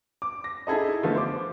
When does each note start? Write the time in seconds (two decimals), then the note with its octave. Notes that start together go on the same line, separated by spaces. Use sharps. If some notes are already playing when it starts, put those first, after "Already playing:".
0.22 D6
0.44 A#6
0.67 D#4 E4 G#4 A4 D#5
1.03 D3 F3 A3 B3
1.16 C5 D6